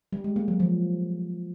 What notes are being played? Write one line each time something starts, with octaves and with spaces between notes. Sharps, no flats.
G3
G#3
A#3
F#3
F3